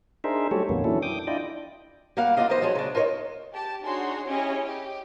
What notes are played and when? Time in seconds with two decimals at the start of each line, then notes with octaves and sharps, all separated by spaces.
0.24 D4 D#4 G#4 A#4 C5 E5
0.51 F#3 G3 A3 G4 A4 C#5
0.69 F2 A#2 D#3 A#3 B3 C#4
0.84 E3 F#3 C#4 D4 E4 A4
1.02 G5 D6 D#6
1.27 D4 E4 F4 D5 D#5 G5
2.17 G3 A#3 F5 F#5
2.37 F4 F#4 A4 D5 D#5 F5
2.49 D#3 F3 G3 B4 C5 D#5
2.62 F3 F#3 G#3 G#4
2.75 C#3 D4
2.95 F4 A#4 C5 C#5 D#5
3.54 G4 A5
3.85 D4 D#4 F#4 G#4 C#5 C6
4.26 C#4 E4 G4 G#4 C#5 D#5
4.64 G4